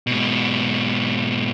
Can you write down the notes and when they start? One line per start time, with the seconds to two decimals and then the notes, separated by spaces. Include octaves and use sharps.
0.07 G#2 B2